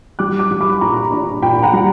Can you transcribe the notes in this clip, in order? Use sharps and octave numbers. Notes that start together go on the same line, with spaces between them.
G3 D6 F#6
D6 F#6
G3
B5 D6
A#2 A#5 C#6
D4
A#2 G5 B5
F#5 A#5
G3